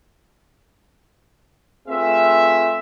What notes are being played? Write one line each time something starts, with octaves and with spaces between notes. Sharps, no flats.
A3 C4 F4 G#4 B4 E5